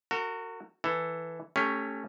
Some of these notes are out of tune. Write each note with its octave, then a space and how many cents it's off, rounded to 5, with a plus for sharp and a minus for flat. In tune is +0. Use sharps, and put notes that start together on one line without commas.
F#4 +0 A#4 -40
E3 +0 A4 +5
A3 +15 C#4 +0 G4 +30